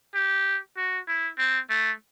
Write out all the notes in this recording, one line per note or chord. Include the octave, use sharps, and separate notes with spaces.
G4
F#4
E4
C4
A3